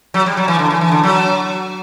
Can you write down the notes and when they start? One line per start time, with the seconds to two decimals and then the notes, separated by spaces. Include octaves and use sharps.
0.14 F#3
0.26 G3
0.37 F#3
0.48 E3
0.59 D3
0.70 E3
0.81 E3
0.92 D3
1.04 F#3